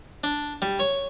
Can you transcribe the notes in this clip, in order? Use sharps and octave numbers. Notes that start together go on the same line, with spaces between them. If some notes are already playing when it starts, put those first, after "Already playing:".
D4
G3
C#5